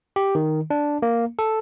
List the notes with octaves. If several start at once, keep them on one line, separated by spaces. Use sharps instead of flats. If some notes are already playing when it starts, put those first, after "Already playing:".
G4
D#3
D4
A#3
A4